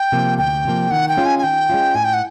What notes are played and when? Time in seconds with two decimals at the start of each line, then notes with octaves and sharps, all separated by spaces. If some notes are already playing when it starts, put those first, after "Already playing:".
Already playing: G5
0.12 C3 F3 A#3
0.38 D2 G5
0.65 C3 F3 A#3
0.91 D#3 F#5
1.09 G5
1.17 G#3 C#4 F4
1.26 G#5
1.39 G#5
1.43 D#3 G5
1.70 G#3 C#4 F4
1.95 A2 G#5
2.04 G5
2.14 F#5